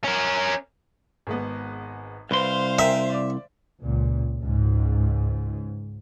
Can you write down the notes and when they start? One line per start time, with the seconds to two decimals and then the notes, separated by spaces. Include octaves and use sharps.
0.04 C#4 A#4
1.27 G#1 G#3 B3
2.31 C2 B4 C5 F5 C6
2.79 A#4 E5 G5 G#5
3.10 D5 D6
3.81 C#2 A#2
4.39 C#2 G#2